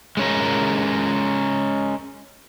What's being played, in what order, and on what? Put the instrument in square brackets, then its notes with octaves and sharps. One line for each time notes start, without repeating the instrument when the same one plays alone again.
[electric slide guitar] G#3 C#4 A#4